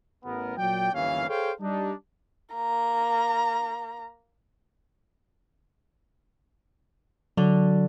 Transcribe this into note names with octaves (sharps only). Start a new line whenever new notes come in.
A1 B3 A#4
A#2 F#3 D5 G5
G1 D#2 E3 C#4 F5
G#4 A4 C5 C#5 F5 G5
G3 D4 D#4
A#3 A#5
D3 F#3